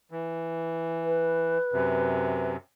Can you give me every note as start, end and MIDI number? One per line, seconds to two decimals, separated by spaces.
0.11 1.58 52
1.05 2.52 71
1.73 2.56 42
1.73 2.56 48